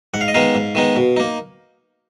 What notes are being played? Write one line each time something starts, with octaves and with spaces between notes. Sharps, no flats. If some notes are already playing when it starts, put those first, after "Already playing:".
G#2 F#5
F5
D#5
D#3 G#3 B3 D#4 F5
G#2
D#3 G#3 B3 D#4
B2
A#3 D#4